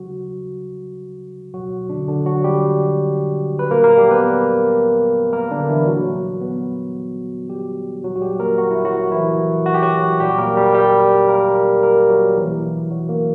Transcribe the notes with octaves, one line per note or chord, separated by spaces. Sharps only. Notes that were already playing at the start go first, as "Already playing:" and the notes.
Already playing: C#3 F#3 G3 F#4
B2 F#3 F#4
D3 D4
D3 D4
F#3 F#4
G3 G4
B4
A#2 F#3 A#3 A#4
A#3 A#4
G3 G4
B3 B4
A#3 A#4
D3 D4
E3 E4
A#2 F#3 G3 F#4
B3
G3 G4
A#2 F#3 F#4
F#4
G3 G4
A#3 A#4
F#4
E4
F#3 F#4
E3 E4
F#4
G4
F#3 F#4
A#2 F#3 G3 G4
A#3 A#4
G3 G4
G3 G4
A#3 A#4
A#3 A#4
F#3 F#4
B2 E3 F#3 E4
F#3 F#4
A#3 A#4